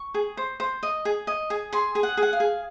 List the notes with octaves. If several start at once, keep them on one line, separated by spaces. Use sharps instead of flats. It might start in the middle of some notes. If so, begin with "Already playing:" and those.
Already playing: C#6
G#4
C5
C5
D#5
G#4
D#5
G#4
G#4 C6
G#4
F#5
G#4
F#5
F5
G#4